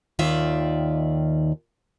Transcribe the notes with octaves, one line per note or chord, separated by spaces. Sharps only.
D#2 D#3 F4 D5 E5